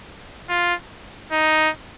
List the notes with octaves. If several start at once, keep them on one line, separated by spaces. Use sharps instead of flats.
F4
D#4